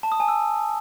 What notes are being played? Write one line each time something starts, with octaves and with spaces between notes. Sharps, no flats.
A5
D#6
G#5
E6